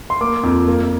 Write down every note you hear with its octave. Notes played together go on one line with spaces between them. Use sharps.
C6
A#3 D6
F2
A#3